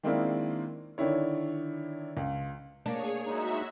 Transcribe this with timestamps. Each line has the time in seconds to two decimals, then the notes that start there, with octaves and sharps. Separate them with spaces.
0.03 D#3 G#3 A#3 C4 D4 E4
0.98 D3 D#3 D4 E4 C#5
2.17 C#2
2.86 A#3 D4 G#4 C#5
3.26 G#3 D#4 F#4 E5